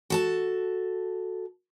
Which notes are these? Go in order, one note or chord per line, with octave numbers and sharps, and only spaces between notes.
F#4 A4 A5